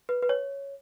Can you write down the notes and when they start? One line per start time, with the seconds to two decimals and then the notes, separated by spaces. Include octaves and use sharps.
0.09 B4
0.22 B4
0.29 C#5